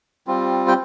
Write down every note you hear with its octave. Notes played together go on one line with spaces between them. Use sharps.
G3 C4 F4
G5